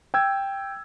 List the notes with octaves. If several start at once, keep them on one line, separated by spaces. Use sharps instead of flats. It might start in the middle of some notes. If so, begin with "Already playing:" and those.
G5 E6 G#6